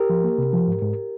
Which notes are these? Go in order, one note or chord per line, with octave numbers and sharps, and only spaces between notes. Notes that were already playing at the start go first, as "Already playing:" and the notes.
Already playing: G4 A#4
F3
A#3
C3
F3
G#2
G#2